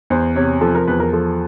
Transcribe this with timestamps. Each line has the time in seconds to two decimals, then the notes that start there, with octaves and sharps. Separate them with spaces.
0.10 E2 C5
0.36 C3 C#5
0.61 F3 A4
0.75 A#4
0.87 E2 B4
1.00 A#4
1.13 F3 A4